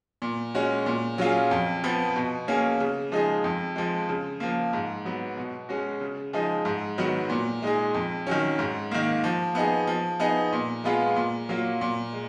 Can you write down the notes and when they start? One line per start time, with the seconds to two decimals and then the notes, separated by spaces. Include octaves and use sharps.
0.22 A#2
0.55 G#3 C#4 F#4
0.86 A#2
1.18 F#3 C#4 F4 G#4
1.51 F2
1.84 F3 B3
2.16 B2
2.48 A#3 C#4 G#4
2.80 C#3
3.12 F3 G#3 D#4 G#4
3.44 F2
3.76 F3 G#3
4.09 C#3
4.40 F3 A#3
4.73 G#2
5.05 F#3 B3
5.37 B2
5.69 G#3 C#4 F#4
6.01 C#3
6.33 F3 G#3 D#4 G#4
6.65 G#2
6.98 D#3 F#3 B3 F#4
7.30 A#2
7.62 G#3 D#4 G#4
7.94 F2
8.27 D#3 F#3 C#4
8.59 G#2
8.91 D#3 A#3
9.24 F3
9.55 B3 D#4 G#4
9.87 F3
10.20 B3 D#4 G#4
10.52 A#2
10.84 G#3 B3 F4 G#4
11.16 A#2
11.49 F#3 A#3 F4
11.81 A#2
12.13 G#3